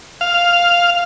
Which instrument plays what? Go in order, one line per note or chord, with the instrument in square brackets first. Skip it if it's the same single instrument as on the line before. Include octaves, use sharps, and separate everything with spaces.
[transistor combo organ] F5